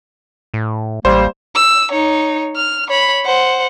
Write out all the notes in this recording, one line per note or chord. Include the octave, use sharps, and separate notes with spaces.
A2
A1 G3 A#3 C5
E6
D#4 C#5
F6
C#5 B5
C5 F#5